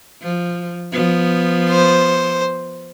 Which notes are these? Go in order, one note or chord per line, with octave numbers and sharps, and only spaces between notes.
F3
F3 B3
C5